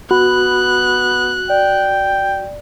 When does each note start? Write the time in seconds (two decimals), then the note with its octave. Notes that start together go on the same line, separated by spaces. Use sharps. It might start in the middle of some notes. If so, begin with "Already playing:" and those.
0.11 B3 F#4 B5 F#6
1.50 D5 G5